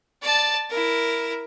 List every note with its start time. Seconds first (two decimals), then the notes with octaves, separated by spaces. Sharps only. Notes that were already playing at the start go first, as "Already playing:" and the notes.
0.22 D5 A5
0.70 E4 A#4